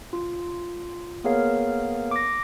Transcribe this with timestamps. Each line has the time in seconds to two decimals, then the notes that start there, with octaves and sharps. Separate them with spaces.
0.13 F4
1.24 A#3 B3 G#4 A#4 C#5 F5
2.11 D6 A#6